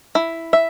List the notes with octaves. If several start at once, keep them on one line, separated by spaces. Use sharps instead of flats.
E4
E5